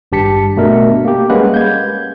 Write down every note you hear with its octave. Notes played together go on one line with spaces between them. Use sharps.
G#1 G2 G4 A5 B6 C#7
B2 A3 D4 A#4
A#3 G4
G3 G#3 A#3 C#4 B4 F#5
G6 G#6